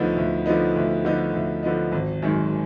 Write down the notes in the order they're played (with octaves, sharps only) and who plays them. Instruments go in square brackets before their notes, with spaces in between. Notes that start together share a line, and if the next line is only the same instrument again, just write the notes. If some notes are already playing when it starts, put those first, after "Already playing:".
Already playing: [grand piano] D2 D3 F3 B3 D#4
D2
D3 F3 B3 D#4
D2
D3 F3 B3 D#4
D2
D3 F3 B3 D#4
G#1
F#2 D#3 G#3